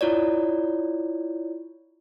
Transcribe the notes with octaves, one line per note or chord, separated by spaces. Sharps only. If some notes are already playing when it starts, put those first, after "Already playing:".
E4 F4 C#5 D5